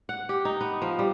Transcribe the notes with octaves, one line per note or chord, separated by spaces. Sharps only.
F#5
G4
D#4
B3
F3
G3